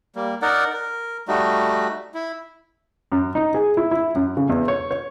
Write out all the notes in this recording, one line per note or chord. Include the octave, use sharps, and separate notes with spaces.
G3 A#3
D#4 A#4 D5 F#5
A#4
G3 A3 D#4 F#4
E4
F#2
D#4
G#4
E4
E4
F#2
C#3
E2
C#5
C#5